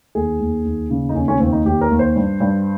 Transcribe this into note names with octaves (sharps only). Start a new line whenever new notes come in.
D#2 G#4
D#2
D#2
C#3
D#4
D#2 C#4
C#4
D#2 C4
D#4
D#2 G4
A#4
D#2
C5
G2
G2